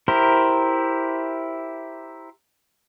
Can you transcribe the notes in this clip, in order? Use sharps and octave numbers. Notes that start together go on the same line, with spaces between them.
E4 G4 A#4 C5